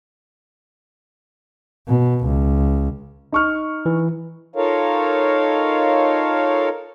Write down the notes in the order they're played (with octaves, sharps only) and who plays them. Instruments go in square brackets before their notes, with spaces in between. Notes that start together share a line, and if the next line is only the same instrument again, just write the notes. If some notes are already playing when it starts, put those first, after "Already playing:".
[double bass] B2
C#2
[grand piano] D#4 C#6 F6
[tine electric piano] E3
[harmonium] D#4 F4 A4 A#4 C#5 F5